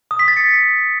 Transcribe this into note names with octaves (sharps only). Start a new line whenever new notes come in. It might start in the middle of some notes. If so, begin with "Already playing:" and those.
D#6
B6
A6
C#7